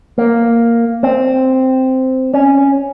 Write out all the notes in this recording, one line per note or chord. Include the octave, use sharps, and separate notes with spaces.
A#3
C4
C#4